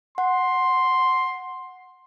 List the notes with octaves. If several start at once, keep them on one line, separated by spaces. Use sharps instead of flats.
F#5 C6